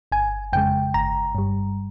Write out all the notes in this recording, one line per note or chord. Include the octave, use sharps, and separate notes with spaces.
G1 G#5
F2 C#3 G#3 G5
G1 A#5
G2 G3